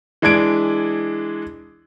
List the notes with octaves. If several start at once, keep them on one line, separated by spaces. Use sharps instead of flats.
E3 G#3 D4 G#6 D7